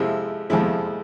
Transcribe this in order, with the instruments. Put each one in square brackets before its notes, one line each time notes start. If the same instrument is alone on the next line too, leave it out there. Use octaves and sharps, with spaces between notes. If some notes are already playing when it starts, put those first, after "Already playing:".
Already playing: [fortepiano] F2 C3 F3 G#3 E4
F2 C3 F3 G#3 E4